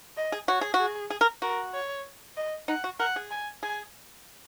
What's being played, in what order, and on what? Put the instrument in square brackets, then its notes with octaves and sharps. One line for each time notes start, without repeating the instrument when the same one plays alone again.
[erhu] D#5
[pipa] G#4
[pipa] F#4 [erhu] C#5
[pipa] G#4
F#4
[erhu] G#4
[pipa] G#4
A#4
[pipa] F#4 [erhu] A#4
[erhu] C#5
D#5
[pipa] D#4 [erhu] F#5
[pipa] F#4
[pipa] A#4 [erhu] F#5
[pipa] G#4
[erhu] G#5
[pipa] G#4 [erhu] G#5